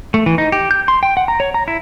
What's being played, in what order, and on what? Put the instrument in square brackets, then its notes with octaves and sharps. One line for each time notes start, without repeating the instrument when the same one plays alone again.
[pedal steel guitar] A3
E3
D#4
G4
G6
C6
G5
F#5
A#5
C#5
A#5
E4